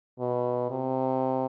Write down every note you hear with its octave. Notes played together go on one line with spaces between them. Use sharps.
B2
C3